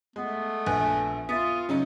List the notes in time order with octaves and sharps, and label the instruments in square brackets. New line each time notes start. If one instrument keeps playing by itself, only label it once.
[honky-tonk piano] G#3 [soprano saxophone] A3 [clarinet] B3
[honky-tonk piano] A#1 [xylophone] B4 G#5 F#6
[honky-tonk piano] B3 [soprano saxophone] F4 [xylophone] E5 A6 B6 [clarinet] D#6
[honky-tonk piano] C#3 C#4 D#4 [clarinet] F#3